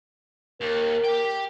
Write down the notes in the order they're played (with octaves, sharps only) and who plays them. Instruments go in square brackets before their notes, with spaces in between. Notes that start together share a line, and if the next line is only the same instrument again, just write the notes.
[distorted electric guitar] D#2 [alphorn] A#4
[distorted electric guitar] G4 G5